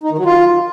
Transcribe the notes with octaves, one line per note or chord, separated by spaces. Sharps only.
D#4
D#3
F#3
F4